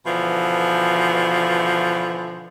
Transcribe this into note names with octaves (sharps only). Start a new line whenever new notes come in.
B2 D3 E3 F3